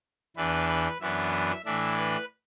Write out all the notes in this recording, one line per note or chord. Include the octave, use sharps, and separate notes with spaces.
E2 E3 D4 B4
B4
F#2 E3 B3 D4 E5
E5
A2 E3 D4 E5
B4